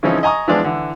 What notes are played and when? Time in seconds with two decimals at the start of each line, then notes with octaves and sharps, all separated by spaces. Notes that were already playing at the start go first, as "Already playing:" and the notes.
0.03 C#3 E3 F3 C4 C#4 D#4
0.23 D#5 G#5 A#5 C#6 D#6
0.48 E3 F3 G#3 B3 D4 D5
0.64 D3 E3